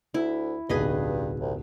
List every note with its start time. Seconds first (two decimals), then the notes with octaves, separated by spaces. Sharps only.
0.14 D2 E4
0.69 D1 B1 G2 G#4 B4 D#5
1.40 C2